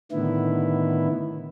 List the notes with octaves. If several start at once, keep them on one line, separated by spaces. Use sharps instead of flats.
A2 D3 D#3 B3 E4